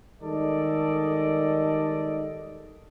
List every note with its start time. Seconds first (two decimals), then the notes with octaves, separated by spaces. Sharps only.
0.21 D#3 G3 G#3 A4 D5 D#5